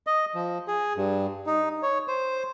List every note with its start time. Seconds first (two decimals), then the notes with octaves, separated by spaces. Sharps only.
0.07 D#5
0.35 F3
0.68 G#4
0.96 G2
1.46 D#4
1.83 C#5
2.08 C5